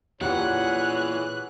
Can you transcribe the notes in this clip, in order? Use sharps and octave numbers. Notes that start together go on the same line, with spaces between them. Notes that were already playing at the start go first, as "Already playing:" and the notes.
A#2 E3 F4 G4 G#4 C#5 F#5 F#6